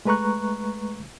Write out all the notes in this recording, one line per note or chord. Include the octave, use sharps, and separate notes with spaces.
G#3 A3 B4 A#5 C#6 F#6